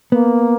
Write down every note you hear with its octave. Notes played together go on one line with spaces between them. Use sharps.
A#3 B3